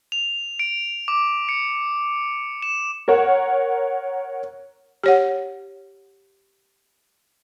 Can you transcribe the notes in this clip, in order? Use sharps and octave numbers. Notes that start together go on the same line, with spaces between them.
F7
D7
D6
C#7
E7
A#4 C#5 F#5
G4 C#5 F#5